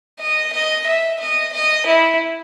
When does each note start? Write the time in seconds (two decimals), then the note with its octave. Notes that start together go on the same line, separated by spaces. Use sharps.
0.19 D#5
0.53 D#5
0.87 E5
1.20 D#5
1.53 D#5
1.86 E4